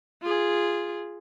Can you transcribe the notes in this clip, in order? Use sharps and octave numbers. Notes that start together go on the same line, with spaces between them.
F4 G#4